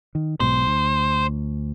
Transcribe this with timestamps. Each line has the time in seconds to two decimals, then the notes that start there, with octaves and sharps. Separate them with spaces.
0.15 D#3
0.40 B1 G#2 B2 C5
0.67 D2